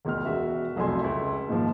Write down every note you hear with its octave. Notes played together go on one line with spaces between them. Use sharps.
E1 C#2 B2 F6
E1 F#4 E5
C2 F2 F#3 A3 G#5 C6
C#2 E5
D#2 G#2 F3